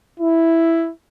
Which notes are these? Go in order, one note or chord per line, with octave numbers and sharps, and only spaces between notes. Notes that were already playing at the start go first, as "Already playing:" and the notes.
E4